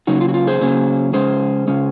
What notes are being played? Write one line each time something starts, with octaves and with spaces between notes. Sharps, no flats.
C#3 F#3 A#3 C#4 D#4 F#4
F4
F#4
F4
G#4 C5
C#3 F#3 A#3 C#4
C#3 G#3 C#4 G#4 C5
C#3 G#3 C#4